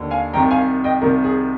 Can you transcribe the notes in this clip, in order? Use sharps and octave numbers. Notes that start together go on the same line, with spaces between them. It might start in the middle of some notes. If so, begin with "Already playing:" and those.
Already playing: D#2 D3
F5 G#5
C2 C3 D#3 G5 A#5
F5 G#5
D#5 G5
C2 C3 D#3 A#4
G#4